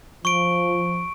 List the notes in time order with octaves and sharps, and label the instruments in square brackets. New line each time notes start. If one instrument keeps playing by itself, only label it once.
[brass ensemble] F3 [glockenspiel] C#6 D7